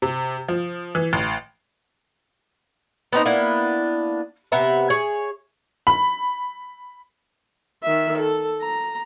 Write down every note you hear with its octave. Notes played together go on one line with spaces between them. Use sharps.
C3
F3
E3
A1
B3 C4 D#4 D#5
A#3 B3 D4 E4
C3 B3 E5 A#5
G#4 C#5
B5
D#3 E5
A4
A#5